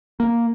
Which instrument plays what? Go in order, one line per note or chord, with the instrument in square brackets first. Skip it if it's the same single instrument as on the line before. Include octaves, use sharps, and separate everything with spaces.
[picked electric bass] A#3